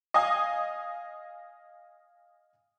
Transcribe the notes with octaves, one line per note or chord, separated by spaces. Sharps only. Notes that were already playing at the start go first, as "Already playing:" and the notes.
D#5 F5 G#5 D#6